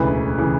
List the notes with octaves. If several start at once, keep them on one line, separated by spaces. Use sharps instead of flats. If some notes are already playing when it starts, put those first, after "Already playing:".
Already playing: E1 D2 C#3 E3 B4
C#3 E3